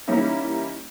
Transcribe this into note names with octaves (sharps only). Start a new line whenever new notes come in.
E3 G3 A#3 C#4 D#4 E4